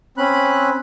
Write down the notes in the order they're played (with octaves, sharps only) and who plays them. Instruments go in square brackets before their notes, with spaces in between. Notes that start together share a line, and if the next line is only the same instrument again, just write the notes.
[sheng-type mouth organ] C4 C#4 B5 F#6